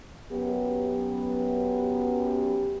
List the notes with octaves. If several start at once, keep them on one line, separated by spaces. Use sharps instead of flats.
F#2 B3 G4